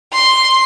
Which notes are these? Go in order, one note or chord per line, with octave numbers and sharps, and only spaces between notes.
C6